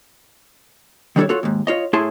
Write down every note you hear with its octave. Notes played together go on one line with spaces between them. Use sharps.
D#3 G3 D4 G#4 A4 C#5
F4 F#4 A4 C#5
D#2 G#2
F4 C#5 D#5
A2 E4 G#4 G#5 A5 C6